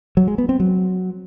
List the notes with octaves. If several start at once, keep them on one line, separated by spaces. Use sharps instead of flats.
F#3
G#3
B3
C4
F#3